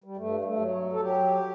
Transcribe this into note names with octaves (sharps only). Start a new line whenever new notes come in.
G3
G2 A3
G3
A3
F#3
A4
F#3 G4